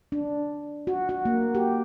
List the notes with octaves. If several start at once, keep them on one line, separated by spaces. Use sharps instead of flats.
D4
F#4
F#4
A#3
G4